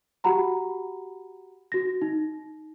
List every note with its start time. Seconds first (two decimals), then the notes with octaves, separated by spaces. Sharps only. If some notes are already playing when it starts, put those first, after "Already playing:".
0.24 F#4 G4 F#5 A#5 B5
1.72 F#4 A#6
2.02 D#4